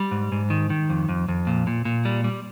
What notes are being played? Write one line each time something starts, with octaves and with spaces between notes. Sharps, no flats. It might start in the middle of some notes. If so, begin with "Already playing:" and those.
Already playing: G3
G#2
G#2
D#3
D#3
F2
F2
F2
A#2
A#2
A#2
G3
G3